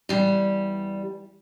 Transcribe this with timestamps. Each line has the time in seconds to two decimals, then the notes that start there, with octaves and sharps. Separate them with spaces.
0.09 E2 G3